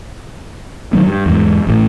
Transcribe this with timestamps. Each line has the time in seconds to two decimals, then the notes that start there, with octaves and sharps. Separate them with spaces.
0.93 D#3 F#3 B3
1.07 G2
1.26 E2 G#2
1.67 A1 A2